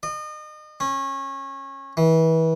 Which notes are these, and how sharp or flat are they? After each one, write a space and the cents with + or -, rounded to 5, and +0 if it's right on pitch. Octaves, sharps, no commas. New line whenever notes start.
D#5 -35
C#4 -25
E3 -30